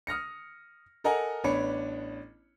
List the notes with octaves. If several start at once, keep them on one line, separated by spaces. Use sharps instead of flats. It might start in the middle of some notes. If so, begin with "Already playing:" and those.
D#6 F6 A#6 C#7
A4 A#4 D#5 F#5 G#5 A#5
A1 B3 D4 C#5 B5 C#7